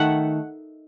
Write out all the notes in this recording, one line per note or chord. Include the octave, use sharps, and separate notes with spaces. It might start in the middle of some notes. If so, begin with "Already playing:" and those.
Already playing: D#3 A3 E5 F#5